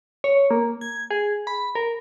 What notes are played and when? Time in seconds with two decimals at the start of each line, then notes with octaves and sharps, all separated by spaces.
0.24 C#5
0.51 A#3
0.81 G#6
1.10 G#4
1.47 B5
1.75 A#4